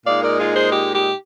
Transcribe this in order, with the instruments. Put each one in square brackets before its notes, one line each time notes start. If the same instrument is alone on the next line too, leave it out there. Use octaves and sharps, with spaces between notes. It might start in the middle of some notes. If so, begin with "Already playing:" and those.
[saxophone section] A#2 G#3 D#4 D5 F5
A#4 D5
F4 G#4
G#4 C5
G4
G4